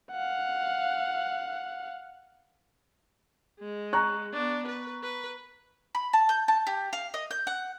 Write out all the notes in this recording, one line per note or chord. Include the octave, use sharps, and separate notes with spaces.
F5 F#5
G#3
A#5 C#6 F#6
B3 D4
B4
B4
B5
A5
G6
A5
G4
F5
D#5
G6
F#5